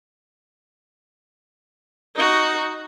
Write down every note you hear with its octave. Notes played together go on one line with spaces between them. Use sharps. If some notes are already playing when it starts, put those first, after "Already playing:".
D#4 F#4